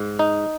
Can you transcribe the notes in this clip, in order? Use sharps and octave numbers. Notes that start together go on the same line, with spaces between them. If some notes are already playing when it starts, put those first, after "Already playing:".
Already playing: G#2
D#4